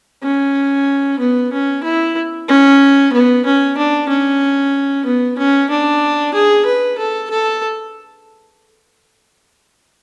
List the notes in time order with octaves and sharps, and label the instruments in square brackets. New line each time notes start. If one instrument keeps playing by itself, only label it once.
[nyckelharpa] C#4
B3
C#4
E4
C#4
B3
C#4
D4
C#4
B3
C#4
D4
G#4
B4
A4
A4